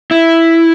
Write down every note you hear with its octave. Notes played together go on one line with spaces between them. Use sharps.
E4